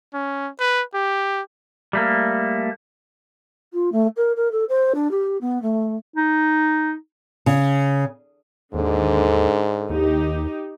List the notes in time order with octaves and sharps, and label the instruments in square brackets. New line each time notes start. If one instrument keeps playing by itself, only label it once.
[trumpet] C#4
B4
G4
[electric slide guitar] G3 A3 A#3
[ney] F4
A3
A#4
A#4
A4
C5
D4
G4
B3
A3
[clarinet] D#4
[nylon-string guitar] C#3
[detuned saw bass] D#2 [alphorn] G#2 [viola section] D3
[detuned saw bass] D#2 [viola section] D#4 G4